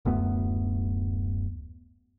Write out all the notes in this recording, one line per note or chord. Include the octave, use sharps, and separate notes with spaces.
D1 F#2 A3 B3